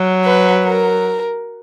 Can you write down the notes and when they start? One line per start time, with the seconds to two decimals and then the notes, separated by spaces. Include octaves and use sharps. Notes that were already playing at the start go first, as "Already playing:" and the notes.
Already playing: F#3
0.24 B4
0.66 A#4